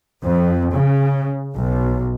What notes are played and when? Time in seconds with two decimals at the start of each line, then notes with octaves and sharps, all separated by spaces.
0.24 F2
0.74 C#3
1.56 B1